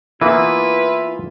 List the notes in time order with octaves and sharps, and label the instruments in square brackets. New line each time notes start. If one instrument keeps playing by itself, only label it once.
[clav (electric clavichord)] E3 A#3 B3 [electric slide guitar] E4 [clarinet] F4 [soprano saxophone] B4